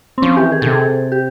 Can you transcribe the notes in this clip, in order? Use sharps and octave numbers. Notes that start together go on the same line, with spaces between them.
C4
F3 C#4
E3 G4
D#3 G#4
B2 A4
C3
G#4
G4